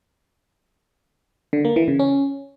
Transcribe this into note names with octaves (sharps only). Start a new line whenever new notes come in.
D3
A#3
E3
C#3
C#4